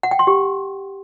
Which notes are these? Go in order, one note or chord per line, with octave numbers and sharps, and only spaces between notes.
F#5
G5
C6
G4